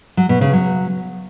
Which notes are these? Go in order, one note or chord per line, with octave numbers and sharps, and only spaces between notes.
F#3
B2
C#3
F#3